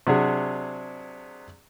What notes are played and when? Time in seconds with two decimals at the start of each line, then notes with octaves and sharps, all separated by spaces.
0.07 C3 F#3 D4 G#4